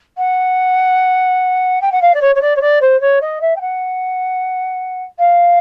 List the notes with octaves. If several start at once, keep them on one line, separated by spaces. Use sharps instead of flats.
F#5
G5
F#5
F5
D5
C#5
C#5
D5
C#5
D5
C5
C#5
D#5
E5
G5
F#5
F5